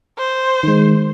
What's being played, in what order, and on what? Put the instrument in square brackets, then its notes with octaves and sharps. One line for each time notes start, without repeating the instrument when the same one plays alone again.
[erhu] C5
[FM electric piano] D#3 G#3